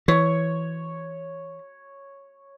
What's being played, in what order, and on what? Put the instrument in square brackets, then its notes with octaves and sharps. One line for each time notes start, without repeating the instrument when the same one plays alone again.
[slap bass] E3 [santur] C#5 C#6